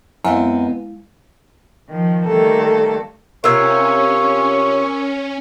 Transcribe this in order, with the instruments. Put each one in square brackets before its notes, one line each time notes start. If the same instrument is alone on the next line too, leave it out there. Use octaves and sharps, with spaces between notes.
[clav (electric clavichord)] F#2 [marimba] G#3 E4 [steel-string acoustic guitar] B3 C4 D#5 [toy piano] F5 G#5
[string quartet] D#3 F3
D#3 G3 A3 A#3 A4
[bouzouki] C3 F4 [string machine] C#4 [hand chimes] A#4 E6 G#6 [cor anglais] C#5